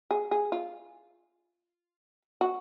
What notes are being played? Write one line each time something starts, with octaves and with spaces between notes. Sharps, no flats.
G#4
G#4
F4
F#4